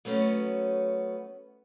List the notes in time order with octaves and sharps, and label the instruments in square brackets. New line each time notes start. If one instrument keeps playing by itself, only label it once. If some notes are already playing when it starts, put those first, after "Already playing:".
[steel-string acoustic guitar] F#3 A3 B3 C#4 F#4